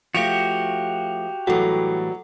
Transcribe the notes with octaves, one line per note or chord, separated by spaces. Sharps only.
F3 A3 F#4 G4 F5 C#7 F7
A2 E3 F#3 G3 A4 F#5